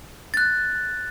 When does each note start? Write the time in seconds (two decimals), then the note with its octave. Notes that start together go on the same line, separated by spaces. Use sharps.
0.34 F#6 A6